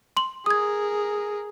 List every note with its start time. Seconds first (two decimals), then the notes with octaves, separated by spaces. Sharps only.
0.17 C6 F#7
0.46 G#4 A#4 D#6 G#6